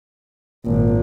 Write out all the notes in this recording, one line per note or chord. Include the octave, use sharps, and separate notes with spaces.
G#1 A#2